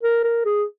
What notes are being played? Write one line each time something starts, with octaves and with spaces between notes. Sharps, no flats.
A#4
A#4
G#4